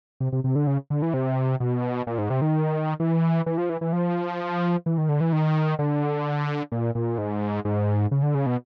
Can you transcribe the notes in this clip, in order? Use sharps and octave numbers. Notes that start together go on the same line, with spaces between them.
C3
C3
C3
D3
C#3
D3
E3
C3
B2
A#2
G#2
C3
D#3
E3
E3
F3
E3
E3
F3
E3
D#3
D3
E3
D#3
D3
A#2
A#2
G#2
G#2
C#3
D3
C#3
B2